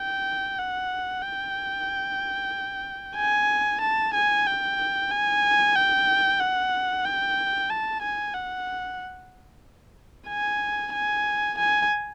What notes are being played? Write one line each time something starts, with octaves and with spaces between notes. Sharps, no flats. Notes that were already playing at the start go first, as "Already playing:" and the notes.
Already playing: G5
F#5
G5
G#5
A5
G#5
G5
G#5
G5
F#5
G5
A5
G#5
F#5
G#5
G#5
G#5